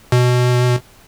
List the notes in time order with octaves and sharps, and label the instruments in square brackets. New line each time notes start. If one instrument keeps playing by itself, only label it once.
[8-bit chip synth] B2